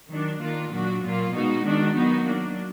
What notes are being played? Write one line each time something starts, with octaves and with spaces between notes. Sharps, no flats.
D#3 F#3 D4
D#3 A#3 D4 F4
A#2 F#3 D4 F#4
A#2 F#3 A#3 F4
B2 G#3 D#4 F#4
D#3 G#3 D4 F#4
D#3 F#3 B3 D#4 F#4
F#3 A#3 D4